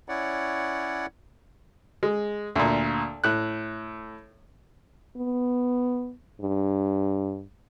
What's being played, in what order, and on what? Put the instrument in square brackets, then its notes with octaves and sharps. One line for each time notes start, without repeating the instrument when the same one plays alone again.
[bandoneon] C#4 E4 C#5 D5 F#5
[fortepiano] G#3
D2 A#2
A2 F#6
[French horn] B3
G2